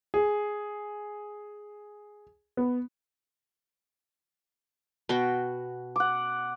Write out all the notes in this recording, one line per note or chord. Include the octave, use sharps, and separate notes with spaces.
G#4
B3
B2 F#4 G5
F#5 D6